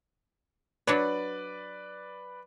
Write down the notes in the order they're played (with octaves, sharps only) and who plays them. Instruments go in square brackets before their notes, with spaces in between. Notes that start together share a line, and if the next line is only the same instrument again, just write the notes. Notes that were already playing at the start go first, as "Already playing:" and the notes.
[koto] F#3 D4 C#5 [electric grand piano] B4 D5